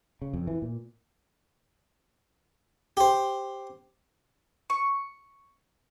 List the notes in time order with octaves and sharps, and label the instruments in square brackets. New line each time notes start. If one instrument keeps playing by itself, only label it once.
[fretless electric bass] C#3
F2
E3
A#2
[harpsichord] G4 C5
[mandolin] C#6